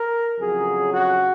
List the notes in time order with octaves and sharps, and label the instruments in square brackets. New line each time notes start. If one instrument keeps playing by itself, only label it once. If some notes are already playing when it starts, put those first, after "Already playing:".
Already playing: [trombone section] A#4
F2 C#3 F#3 G#4
F#4